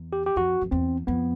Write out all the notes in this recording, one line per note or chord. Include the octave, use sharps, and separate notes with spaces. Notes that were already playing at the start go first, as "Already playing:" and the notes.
Already playing: E2
G4
G4
F2 F#4
F2
E2 C4
F2 B3